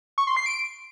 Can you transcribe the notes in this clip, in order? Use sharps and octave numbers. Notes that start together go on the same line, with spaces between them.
C#6
C6
C7
D7